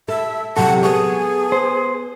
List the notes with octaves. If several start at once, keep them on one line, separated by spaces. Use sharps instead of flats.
A4 E5
E2 C3 F#3 A4 F#5
B3 G#4 C#5
C5